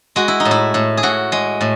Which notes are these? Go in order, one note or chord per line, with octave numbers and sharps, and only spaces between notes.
G#3 F#4
E4
D#4
A2
E4
A2
G#4
A2 F#4
G#3
A2